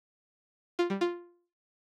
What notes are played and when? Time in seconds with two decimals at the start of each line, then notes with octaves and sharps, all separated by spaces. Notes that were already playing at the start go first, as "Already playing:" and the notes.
0.79 F4
0.90 G3
1.01 F4